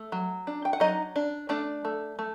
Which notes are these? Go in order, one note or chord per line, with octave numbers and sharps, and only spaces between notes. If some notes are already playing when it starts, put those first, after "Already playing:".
Already playing: A3
F#3
D4
G5
F#5
F#3 D#4 D#5
D4
A3 D4 D5
A3
A3